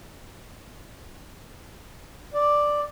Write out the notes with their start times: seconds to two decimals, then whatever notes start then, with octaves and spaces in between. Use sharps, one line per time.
2.34 D5